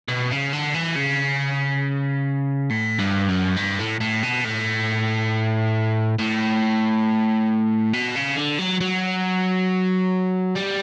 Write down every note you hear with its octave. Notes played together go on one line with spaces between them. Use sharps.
B2
C#3
D3
E3
C#3
A2
G2
F#2
G2
A2
A2
B2
A2
A2
B2
C#3
D3
F#3
F#3
G3